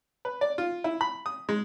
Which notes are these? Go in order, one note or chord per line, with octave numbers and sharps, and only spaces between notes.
B4
D5
F4
E4
B5
D#6
G#3